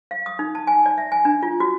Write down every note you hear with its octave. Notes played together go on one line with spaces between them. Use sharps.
F5
D#6
D#4
A5
G#5
D5
E5
G#5
D4
F4
F#4